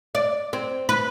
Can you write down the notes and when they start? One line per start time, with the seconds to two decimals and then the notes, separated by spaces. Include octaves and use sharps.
0.15 D5
0.53 C4
0.89 B4